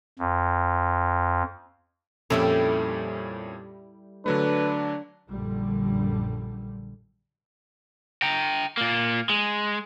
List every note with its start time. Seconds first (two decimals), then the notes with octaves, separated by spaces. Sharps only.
0.19 F2
2.30 F2 A#2 G3 C#4 E4 A4
4.26 D3 F#3 A3 D4 B4
5.30 A#1 F#2 D3 G3
8.22 G5 A#5
8.77 A#2 A#3
9.30 G#3